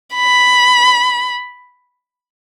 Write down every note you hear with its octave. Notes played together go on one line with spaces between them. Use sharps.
B5